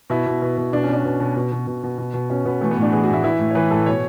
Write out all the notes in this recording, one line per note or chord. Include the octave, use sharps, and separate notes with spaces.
B2 E4
B2
B2
B2
B2 D4
C#4
B2
D4
B2
B2
B2
B2
B2
B2
B2
B2
B2 C#4
B2 B3
E3 A3
B3
A2 D4
F#4
E3 G#4
F#4
A2 E4
E3 E4
A2
C#5
E3 B4
A2 A4
B2 C#5